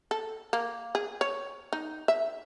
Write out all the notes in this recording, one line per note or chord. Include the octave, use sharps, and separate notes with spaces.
A4
A#3
G#4
C#5
D#4
E5